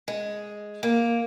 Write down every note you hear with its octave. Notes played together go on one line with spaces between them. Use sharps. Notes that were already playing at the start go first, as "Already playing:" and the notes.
G#3
A#3